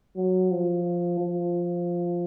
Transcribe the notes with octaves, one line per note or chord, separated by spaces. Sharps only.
F#3
F3
F3